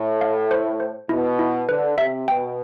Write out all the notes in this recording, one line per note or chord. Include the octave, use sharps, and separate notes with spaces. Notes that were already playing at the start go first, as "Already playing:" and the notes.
Already playing: A2
F5
C5
C5
B2 E4
E4
D3 B4
C3 E5
B2 G5